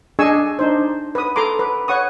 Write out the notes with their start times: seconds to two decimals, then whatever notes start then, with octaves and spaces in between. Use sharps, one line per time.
0.19 D4 G#4 D#5 G#5 C#6 E6
0.59 D4 D#4 C5
1.15 B4 D#6
1.36 A4 A#5 C6 D6
1.59 B4
1.88 C#5 F#5 C#6 D#6